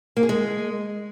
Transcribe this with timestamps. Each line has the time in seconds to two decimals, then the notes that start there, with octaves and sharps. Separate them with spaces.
0.17 A#3
0.23 G#4
0.29 G#3